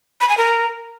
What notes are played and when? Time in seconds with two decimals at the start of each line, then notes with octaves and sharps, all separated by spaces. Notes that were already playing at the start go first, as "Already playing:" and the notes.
0.21 B5
0.29 G#5
0.38 A#4